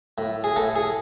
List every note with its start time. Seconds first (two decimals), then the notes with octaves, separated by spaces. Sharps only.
0.18 A2
0.44 G#4
0.56 A2 A4
0.76 G#4